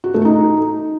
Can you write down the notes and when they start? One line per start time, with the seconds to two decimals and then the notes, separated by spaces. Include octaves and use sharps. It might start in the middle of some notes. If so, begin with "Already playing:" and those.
0.04 F#4
0.14 A3
0.25 D#4